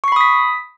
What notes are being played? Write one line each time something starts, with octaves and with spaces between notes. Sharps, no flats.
B5 C#6 D#6 B6 C7